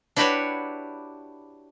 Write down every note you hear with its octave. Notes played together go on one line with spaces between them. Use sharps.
D4 E4 F#4 G4 B4 C#5